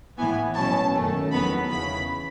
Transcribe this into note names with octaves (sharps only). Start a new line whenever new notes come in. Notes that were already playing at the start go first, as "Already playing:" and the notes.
A2 E3 B3 G#5
B2 F#3 C#4 A5
F#2 D#3 A3 C#4
E2 D#3 F#3 B3 B5
E2 C#3 E3 B5